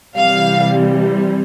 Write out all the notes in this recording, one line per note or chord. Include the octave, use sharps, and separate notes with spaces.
C3 E3 G3 F5